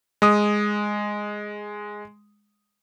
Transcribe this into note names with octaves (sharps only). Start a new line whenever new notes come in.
G#3 D#6